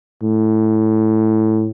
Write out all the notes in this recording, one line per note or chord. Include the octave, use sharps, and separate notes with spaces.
A2